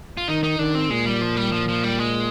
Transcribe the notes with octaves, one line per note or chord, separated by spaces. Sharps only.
F4
D#3 D#4
D#4
D#3 D4
C4
A#2 G#3
G3
F3
G3
F3
F3
G3
G#3